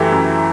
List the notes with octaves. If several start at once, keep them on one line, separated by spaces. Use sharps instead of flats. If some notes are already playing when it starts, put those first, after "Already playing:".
Already playing: F#2 E3 A3 E4 G4
F#2